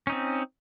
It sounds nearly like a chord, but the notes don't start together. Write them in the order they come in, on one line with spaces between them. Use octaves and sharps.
C#4 D#4 C4